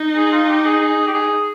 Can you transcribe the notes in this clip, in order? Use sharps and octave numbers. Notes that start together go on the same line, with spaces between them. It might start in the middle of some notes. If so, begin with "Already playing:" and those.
Already playing: D#4
G#4
F4
G4
G#4
G#4
G4
G#4